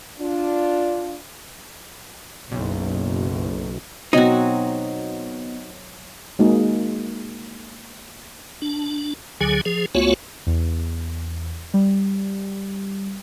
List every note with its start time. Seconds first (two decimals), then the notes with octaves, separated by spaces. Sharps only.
0.20 D4 F4
2.51 F#1 B1
4.13 B2 F#3 C4 D#4 F#4
6.39 G#3 A#3 D#4 F#4 G#4
8.62 D4
9.41 D2 D3 F#3 G#4 G#5
9.65 F3 G#4
9.95 C#2 A3 B3 F4 F#4 C#5
10.46 E2
11.74 G3